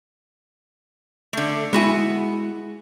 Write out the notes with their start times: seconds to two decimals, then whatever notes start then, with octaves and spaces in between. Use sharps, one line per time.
1.33 D3 A3
1.73 G#3 B3 E4 F#4 G#5